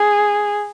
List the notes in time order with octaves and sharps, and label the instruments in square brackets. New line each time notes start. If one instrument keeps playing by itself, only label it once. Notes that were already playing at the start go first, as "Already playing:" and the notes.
Already playing: [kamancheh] G#4